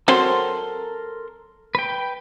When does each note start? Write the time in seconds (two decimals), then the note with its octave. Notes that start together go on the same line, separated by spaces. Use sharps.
0.08 F#3 C4 A4 A#4 C5 C6
1.75 B4 G5